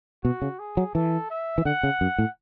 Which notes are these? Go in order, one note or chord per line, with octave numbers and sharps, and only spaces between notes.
B2 F#4
C#3
G#4
F#3
E3 A4
E5
E3
D3 F#5
C#3
F#2
A2